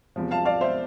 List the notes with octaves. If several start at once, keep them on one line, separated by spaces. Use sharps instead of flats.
E2 C3 F3
F5 A5
D5 F5
C5 E5